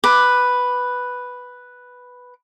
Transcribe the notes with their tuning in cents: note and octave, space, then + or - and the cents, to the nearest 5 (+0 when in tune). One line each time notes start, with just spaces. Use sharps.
B4 +0 D6 +10